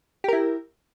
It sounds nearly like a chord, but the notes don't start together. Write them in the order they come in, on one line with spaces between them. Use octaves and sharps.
G4 A#4 E4